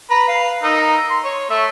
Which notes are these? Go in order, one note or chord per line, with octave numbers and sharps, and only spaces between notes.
B4 A#5 B5
B4 F5
D#4 A#4 E6
C6
C#5
A3 E5